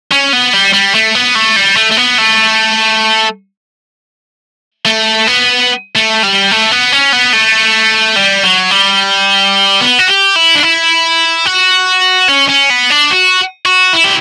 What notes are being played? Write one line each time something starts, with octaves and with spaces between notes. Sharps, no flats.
C#4
B3
G3
G3
A3
B3
A3
G3
A3
A3
B3
A3
A3
B3
A3
G3
A3
B3
C#4
B3
A3
G3
F#3
G3
B3
F#4
G4
E4
D4
E4
F#4
C#4
C#4
B3
D4
F#4
F#4
E4
G4